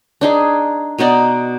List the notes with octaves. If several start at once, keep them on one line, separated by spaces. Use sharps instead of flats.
D4 D#4 G#4
B2 B3 D#4 D5